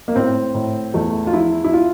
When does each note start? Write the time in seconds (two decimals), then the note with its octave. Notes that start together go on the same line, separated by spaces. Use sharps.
0.08 A#3
0.16 A2 C4
0.54 A2
0.94 E2 A3
1.27 F4
1.33 F3 E4
1.64 E4
1.73 F4